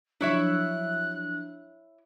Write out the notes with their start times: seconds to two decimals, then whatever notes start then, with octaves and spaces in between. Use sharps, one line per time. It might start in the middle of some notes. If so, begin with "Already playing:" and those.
0.21 F3 F#3 D4 E4 C#5 E5 F#6